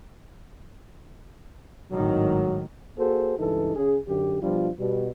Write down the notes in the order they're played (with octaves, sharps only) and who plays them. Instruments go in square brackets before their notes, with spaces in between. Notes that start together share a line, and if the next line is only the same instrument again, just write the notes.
[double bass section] G#1 A2 D#3 [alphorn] F#3
[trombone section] A#3 F#4 G#4 A4 C5
C#2 G2 E3 D#4 A4
C#3 G#4
F#2 D3 G4
B2 F3 G3 D4 F4
B2 G3